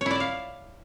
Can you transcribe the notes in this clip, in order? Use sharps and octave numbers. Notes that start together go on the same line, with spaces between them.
E4 C#5 D5 E5 F5